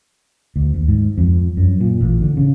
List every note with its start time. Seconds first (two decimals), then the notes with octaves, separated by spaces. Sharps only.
0.56 D2
0.74 D#2
0.88 G#2
1.18 F2
1.57 F#2
1.81 A#2
2.01 A1
2.21 D3
2.37 C#3